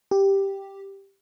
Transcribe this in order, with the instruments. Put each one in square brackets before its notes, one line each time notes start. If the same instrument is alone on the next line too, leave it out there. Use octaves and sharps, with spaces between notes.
[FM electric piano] G4